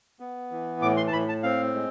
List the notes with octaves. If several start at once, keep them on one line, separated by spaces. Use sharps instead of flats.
B3
E3
A2 D6
C6
A5
A2 B5
A5
C4 F5
G#3